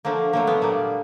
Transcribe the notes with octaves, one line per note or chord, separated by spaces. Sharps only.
D3 F3 A3 A#3
D3 F#3 A3 A#3
B3
A#2 G3 A#3